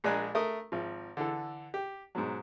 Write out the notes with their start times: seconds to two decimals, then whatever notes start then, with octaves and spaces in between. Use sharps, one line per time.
0.04 A#1 G#3 D4 A#4 G#5 F#6
0.35 A3 A#4 D#6
0.72 G#1 F3
1.17 D3 E3 A4
1.74 G4
2.15 G#2 B2 F#3